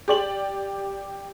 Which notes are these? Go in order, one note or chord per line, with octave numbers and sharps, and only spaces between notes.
G4 D5 F#7